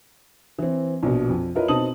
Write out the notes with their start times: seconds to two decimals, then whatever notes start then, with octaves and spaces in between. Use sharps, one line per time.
0.58 E3 C4
1.03 A#1 B2
1.29 F2
1.55 E4 F4 A#4 B4 C#5 D#5
1.68 B2 C4 D#4 A5 D#6 F#7